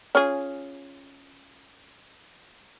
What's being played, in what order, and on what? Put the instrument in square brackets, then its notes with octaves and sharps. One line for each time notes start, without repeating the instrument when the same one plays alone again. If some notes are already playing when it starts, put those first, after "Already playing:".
[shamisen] C#4 F4 G#4